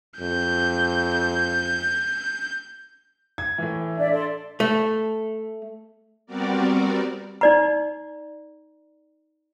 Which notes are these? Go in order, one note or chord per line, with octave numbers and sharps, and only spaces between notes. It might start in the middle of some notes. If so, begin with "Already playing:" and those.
F2 G6
G#6
A2 E3
D4 D5 E5
A4 D5 C6
A3
G3 B3 C4 F#4 A#4 D5
D#4 D5 A#5